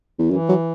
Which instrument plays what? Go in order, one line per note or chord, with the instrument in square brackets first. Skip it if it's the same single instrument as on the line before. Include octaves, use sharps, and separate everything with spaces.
[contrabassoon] E2
[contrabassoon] F#2 [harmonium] E3
[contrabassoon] F#3